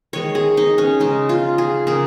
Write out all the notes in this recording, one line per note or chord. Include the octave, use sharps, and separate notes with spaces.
D#3 G#3 C#5
G#4
D#4
C#4
C#3 G#3 D#4
F4
G#4
C#3 A#3 G#4